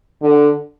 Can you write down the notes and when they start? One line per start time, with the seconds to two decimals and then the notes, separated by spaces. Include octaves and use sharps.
0.22 D3